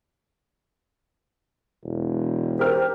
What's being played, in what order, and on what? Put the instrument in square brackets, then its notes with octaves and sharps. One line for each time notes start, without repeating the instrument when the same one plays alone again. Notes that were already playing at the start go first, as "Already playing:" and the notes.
[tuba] E1
[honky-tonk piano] G4 A#4 F6 [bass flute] C5